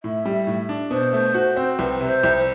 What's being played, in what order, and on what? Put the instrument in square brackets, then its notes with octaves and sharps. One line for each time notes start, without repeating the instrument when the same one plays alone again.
[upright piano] A2 [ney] E5
[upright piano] G3
[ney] E5
[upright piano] A2
D4
[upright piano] B2 [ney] C5
[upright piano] A3
F#4
C4
[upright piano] C2 [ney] B4
[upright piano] C3
[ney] C5
[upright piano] C2
[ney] C5